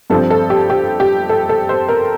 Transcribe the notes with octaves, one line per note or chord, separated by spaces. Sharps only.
G2 F3 C4 A4
A4
G4
G4
G4
A4
A4
C5
A#4